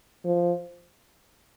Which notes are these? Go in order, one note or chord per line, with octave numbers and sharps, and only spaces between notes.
F3